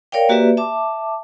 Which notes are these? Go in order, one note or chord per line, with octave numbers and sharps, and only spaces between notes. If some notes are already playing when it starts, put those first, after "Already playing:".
A#4 C#5 D5 F5 G5
A#3 F#4 G4 B4 D5 E5
E5 A5 D6